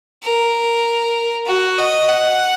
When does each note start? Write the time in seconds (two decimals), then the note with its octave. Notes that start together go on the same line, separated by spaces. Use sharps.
0.24 A#4
1.47 F#4
1.78 D#5
2.08 F#5